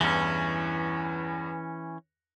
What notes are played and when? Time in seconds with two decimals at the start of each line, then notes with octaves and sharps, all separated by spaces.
0.01 E2 G2 E3 C#4